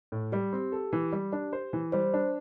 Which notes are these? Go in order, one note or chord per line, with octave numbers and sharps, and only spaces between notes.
A2
G3 G4
C4
A4
E3
G3
D4
C5
E3
G3 C5
D4